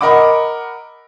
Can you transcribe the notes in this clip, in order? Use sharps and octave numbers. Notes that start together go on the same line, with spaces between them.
A#4 D#5 F#5 B5 D6